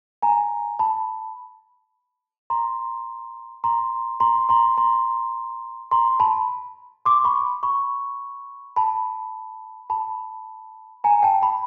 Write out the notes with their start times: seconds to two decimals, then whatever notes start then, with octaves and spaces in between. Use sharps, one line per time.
0.22 G#5 A#5
0.79 A5 B5
2.50 A#5 C6
3.64 A#5 C6
4.20 A#5 C6
4.49 A#5 C6
4.77 A#5 C6
5.91 A#5 C6
6.20 A5 B5
7.05 C6 D6
7.24 B5 C#6
7.63 B5 C#6
8.76 A5 B5
9.90 A5 B5
11.04 G#5 A#5
11.23 G5 A5
11.42 A5 B5